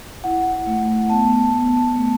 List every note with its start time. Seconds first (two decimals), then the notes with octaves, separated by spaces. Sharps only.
0.24 E4 F#5
0.67 A3
1.10 B3 A5
1.53 B3
1.96 A3